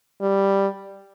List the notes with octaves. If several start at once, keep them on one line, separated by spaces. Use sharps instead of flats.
G3